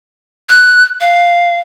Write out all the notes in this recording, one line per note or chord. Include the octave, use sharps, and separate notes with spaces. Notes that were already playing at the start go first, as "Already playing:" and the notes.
F#6
F5